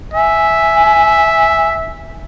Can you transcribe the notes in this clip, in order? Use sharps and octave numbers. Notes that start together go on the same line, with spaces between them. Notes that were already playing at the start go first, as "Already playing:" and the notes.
E5 G#5